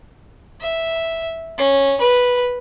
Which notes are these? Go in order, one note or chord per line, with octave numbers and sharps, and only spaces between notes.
E5
C#4
B4